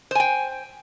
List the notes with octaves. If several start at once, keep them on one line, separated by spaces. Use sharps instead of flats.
C5 G5 G#5